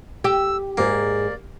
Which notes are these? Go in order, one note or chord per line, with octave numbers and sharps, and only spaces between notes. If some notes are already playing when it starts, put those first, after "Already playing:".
G4 E6
G#2 A#3 G#4 D5